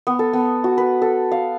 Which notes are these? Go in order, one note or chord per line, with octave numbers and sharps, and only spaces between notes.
B3
A4
B3
F#4
B4
A4
F5